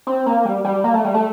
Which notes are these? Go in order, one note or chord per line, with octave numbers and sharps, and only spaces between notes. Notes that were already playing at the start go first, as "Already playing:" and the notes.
C4
A#3
G3
G3
A#3
A3
G3
A3